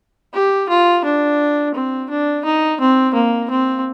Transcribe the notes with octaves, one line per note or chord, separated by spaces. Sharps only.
G4
F4
D4
C4
D4
D#4
C4
A#3
C4